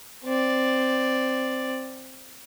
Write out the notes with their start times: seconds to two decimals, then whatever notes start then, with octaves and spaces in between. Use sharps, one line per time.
0.24 C4 D5